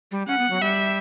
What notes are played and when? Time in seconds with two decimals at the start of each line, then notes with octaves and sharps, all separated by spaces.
0.11 G3
0.28 C#4 F#5
0.39 B3
0.50 F#3
0.61 G3 E5